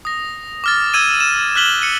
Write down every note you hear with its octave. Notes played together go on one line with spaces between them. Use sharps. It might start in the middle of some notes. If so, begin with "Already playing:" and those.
D#6 A#6
D6 F6 A6
E6 G#6 D#7 E7
E7
F6 F#6 B6 F#7 G7
C#7 D#7